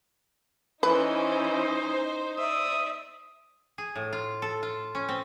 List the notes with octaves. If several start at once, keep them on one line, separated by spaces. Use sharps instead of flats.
E3 C#4 D#4 B4 C5 D#5
D5 E5 D#6
G#4
A2
F4
A4
F4
C#4
C4